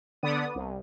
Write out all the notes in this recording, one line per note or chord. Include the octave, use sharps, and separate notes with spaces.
D3 B3 D5 D#6
C2